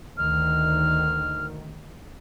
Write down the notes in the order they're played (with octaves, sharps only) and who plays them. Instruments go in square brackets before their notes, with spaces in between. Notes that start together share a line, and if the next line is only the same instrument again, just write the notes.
[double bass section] D2 D#3 [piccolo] F6